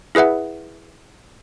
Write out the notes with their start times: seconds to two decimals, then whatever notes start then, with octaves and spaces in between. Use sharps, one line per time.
0.15 E4 G#4 B4 E5 F#5